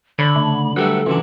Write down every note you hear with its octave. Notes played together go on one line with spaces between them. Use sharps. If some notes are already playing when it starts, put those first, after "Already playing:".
D3 C#5 B5
C#3 A3 D4
F#3 G3 A3 A4 B4 F#5 E6
C#3 E3 F#3 C#4 D4 F4